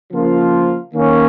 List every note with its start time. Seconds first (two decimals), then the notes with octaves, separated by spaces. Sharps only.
0.11 C#3 F3 A#3 F4
0.93 D#3 A#3 C#4